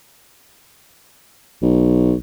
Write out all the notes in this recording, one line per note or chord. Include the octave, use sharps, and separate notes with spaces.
B1